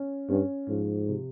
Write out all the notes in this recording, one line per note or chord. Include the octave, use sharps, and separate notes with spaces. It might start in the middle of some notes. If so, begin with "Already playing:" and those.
Already playing: C#4
G2 C#4
G#2 F3
C3